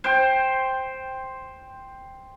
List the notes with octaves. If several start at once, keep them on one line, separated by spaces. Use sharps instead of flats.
C5 G5